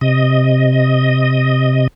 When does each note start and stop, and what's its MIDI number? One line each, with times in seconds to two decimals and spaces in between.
0.01 1.87 48
0.01 1.87 75